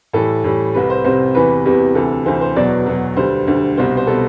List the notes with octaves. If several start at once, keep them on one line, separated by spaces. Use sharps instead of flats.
A2 E3 G3 A4
A2 E3 G3
C2 C3 G3 B4
C5
C2 C3 G3 C5
E2 C3 E3 G3 B4
E2 C3 E3 G3
D2 C3 E3 A4
D2 C3 E3 C5
C5
E2 B2 F#3 D5
E2 B2 F#3
D2 D3 G3 C5
D2 D3 G3
C2 B2 G3 C5
C5
B2 G3 A4